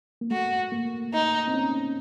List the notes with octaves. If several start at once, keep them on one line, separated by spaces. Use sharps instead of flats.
A#3
A3 F#4
A#3
D#4
C4
C#4